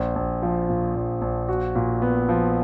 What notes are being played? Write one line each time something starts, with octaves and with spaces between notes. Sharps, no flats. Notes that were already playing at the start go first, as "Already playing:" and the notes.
Already playing: A#1
A#1
F3
A#2
A#1
A#1
F#4
A#2
B3
F3